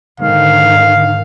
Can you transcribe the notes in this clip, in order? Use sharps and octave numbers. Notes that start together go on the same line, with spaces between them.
G#2 D3 D#3 F5